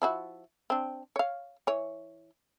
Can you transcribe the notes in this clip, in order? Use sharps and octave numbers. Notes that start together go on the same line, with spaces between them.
F3 E4 F#4
C4 D4
C#5 F5
E3 C#5